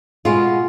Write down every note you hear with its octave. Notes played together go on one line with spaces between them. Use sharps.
B2 G#3 B3 F4